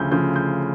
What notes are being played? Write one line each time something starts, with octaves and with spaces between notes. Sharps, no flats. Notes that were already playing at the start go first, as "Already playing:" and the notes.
Already playing: D2 C#3 F3 G6
D2 C#3 F3 G6
G6